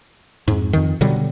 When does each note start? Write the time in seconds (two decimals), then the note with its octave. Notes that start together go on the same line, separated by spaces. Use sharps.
0.48 F2 G#2
0.73 F2 D#3
1.01 B2 D3 F#3 G3